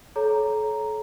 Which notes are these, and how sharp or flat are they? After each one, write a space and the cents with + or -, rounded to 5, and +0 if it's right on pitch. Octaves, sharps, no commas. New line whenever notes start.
A4 -40 C#5 +0 A#5 +0